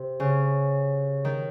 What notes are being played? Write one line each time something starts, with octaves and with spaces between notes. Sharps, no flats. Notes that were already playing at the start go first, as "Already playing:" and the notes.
Already playing: C3
C#3
D#3